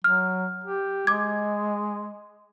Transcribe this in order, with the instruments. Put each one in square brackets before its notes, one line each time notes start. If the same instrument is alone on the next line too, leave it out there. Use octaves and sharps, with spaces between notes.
[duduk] F#3 [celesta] F6
[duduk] G4
[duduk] G#3 [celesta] D6 G#6